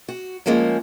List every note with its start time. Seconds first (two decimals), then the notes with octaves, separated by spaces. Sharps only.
0.08 F#4
0.46 F3 G#3 A#3 C4 C#4